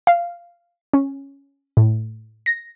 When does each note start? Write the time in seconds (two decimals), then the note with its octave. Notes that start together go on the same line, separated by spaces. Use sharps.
0.07 F5
0.93 C#4
1.77 A2
2.46 A#6